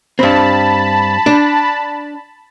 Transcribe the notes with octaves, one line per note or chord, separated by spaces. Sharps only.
G2 C4 A5 B5
D4